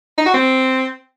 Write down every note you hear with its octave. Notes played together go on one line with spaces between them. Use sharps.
D#4
F#4
C4